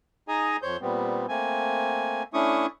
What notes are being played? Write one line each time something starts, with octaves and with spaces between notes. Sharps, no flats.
D#4 G#4 D#5 G#5 A#5 D#6
F2 C5 C#5 G6
A#2 G3 B3 C4
A3 A#3 C4 G#5
A3 C#4 D4 E4 C#6 D#6